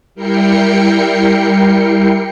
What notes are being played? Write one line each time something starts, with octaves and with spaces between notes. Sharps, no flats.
G3 E4 A#4 G5 C7 C#7